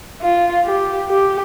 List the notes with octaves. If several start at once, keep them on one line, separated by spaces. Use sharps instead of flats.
F4
G4
G4